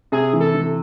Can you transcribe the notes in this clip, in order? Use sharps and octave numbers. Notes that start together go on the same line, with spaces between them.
C3 G#4
E3
A4
E3